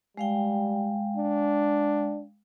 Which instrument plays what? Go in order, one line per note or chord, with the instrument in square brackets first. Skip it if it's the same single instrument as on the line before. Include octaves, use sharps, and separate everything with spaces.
[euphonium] G3 [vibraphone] G#3 F5 G5
[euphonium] D4